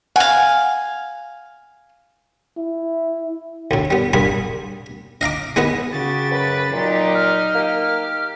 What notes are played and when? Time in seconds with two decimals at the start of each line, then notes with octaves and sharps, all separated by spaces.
0.16 F5 F#5 G#5
2.57 E4
3.71 D2 A2
3.90 G3 B3
4.13 C2 G2 G#4 B5
5.21 D#5 F5 A#5 D6
5.56 G#3 B3 B4 D#5
5.92 C#3 F#4 G4 A6
6.31 F#2 B4
6.73 A#2 F#3 D#4 G4
7.14 F6
7.55 A#3 G4